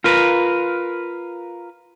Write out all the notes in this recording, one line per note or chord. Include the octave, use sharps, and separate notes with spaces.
F4 A#4 B4